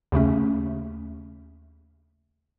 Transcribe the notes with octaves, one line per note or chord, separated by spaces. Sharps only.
D#2 C#3 A3 C#4